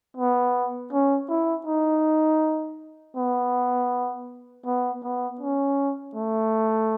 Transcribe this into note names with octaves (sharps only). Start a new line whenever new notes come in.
B3
C#4
E4
D#4
B3
B3
B3
C#4
A3